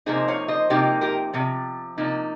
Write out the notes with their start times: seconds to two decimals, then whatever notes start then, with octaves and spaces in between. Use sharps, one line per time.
0.06 C3 F3 A#3 D#4 G#4 C5
0.28 C#5 F5
0.48 C5 D#5
0.70 C3 F3 A#3 D#4 G4
1.01 G4 A#4
1.34 C3 F3
1.98 C3 F3 A#3 D#4